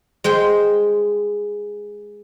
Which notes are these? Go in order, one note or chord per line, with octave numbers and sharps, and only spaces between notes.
G#3 C5 G5